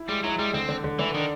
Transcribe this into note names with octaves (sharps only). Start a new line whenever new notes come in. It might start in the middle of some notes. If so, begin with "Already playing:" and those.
Already playing: E4
G3 G#3
F#3 E4
G3 G#3
D3 C4
D3
D3
D3 E3
D#3 D4